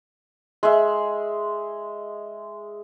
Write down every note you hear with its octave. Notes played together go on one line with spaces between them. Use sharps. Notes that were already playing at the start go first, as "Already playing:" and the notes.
G#3 E5